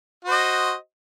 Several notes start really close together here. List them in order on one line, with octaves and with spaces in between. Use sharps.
F#4 C5 D#5